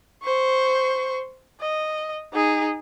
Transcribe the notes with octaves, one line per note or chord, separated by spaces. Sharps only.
C5 C#6
D#5
D#4 G#4